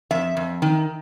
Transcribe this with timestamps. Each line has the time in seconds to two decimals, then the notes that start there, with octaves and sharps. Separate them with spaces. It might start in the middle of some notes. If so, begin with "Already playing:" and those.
0.11 F2 E5
0.37 F2
0.62 D#3